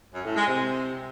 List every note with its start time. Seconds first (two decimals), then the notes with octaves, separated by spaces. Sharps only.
0.14 F#2
0.25 A2
0.36 G#3
0.47 C3